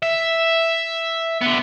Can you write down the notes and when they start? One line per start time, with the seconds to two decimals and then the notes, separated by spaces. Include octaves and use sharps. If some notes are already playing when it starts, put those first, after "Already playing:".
0.03 E5
1.41 D3 B3